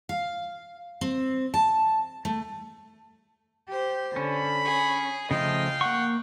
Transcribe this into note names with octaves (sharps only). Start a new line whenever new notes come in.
F5
C4
A5
A3
G4 C5
D3 C#4 B5
G#4
C#3 F3 A3 D#5 F5 G5
A#3 F#5 C#6